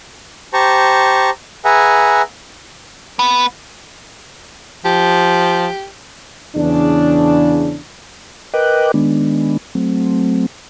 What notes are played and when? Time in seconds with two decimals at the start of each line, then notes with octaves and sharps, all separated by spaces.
0.53 G4 C5 A5 A#5 C#6
1.65 G#4 B4 E5 F#5 G#5 A#5
3.19 B3
4.85 F3 G4
6.56 E2 C#3 D4
8.54 A#4 B4 D#5 G5 D6 F#6
8.94 D#3 G#3 B3 D4
9.75 F#3 A3 C4